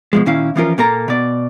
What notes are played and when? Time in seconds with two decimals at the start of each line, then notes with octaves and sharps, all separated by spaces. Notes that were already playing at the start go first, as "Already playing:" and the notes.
0.13 B2 F3 G#3
0.26 A#2 D#3 C#4 E4 F5
0.56 E3 F3 C#4 F4 A#4
0.78 A#2 A#3 A4 A#5
1.08 B2 D5